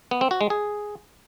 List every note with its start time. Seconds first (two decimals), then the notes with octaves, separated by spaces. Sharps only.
0.11 B3
0.21 C4
0.31 F#4
0.41 G#3
0.50 G#4